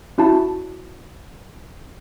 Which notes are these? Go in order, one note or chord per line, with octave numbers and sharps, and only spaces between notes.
C#4 E4 F#4 A5